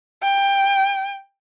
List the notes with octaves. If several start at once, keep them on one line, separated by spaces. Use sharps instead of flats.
G5